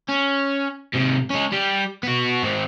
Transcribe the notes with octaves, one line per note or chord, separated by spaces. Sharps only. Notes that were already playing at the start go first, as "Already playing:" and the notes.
C#4
G#2 C3
G#3 C#4
G3 G4
B3 F#4
G#2 C4